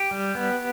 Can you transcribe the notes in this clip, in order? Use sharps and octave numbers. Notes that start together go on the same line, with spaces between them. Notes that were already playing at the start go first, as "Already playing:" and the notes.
Already playing: G4
G3
B3